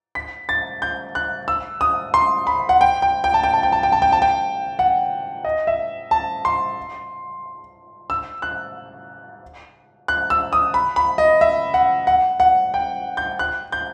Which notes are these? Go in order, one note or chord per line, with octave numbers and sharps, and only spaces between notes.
B6
A6
G6
F#6
E6
D#6
C6
B5
F#5
G5
G5
G5
A5
G5
A5
G5
A5
G5
A5
G5
A5
G5
F#5
D#5
E5
A5
C6
E6
F#6
F#6
E6
D#6
B5
B5
D#5
E5
F#5
F#5
F#5
G5
G6
F#6
G6